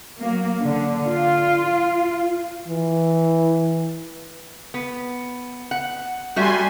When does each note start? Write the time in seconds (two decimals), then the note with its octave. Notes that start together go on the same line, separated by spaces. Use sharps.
0.19 F#3 A#3
0.61 D3
1.06 F4
2.68 E3
4.74 B3
5.71 F#5
6.36 G3 A3 F#4 E5 G#5 C6